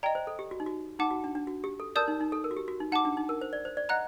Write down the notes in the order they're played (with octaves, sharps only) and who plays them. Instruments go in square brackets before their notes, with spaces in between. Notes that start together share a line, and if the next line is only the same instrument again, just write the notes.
[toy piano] D5 [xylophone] D#5 G5 A#5
[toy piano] C5
A4
G4
F#4
D#4
F#4
[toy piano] D#4 [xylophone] F#5 A5 D6
[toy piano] F#4
D4
D4
F#4
G4
A4
[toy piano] A#4 [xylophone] D5 A5 D#6 G6
[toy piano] D#4
D#4
A4
A#4
F#4
G4
F#4
D#4
[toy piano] D#4 [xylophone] F#5 A5 D6
[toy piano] D4
D#4
A#4
C5
D5
C5
D5
[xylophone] D#5 F#5 A#5 F#6